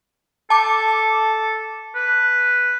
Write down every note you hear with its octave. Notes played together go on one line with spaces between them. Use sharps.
A4 A5 D6
B4